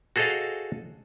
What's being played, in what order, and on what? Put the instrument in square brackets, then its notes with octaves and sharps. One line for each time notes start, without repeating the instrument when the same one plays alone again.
[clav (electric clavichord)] F#4 G#4 A4 C5 D#5 F5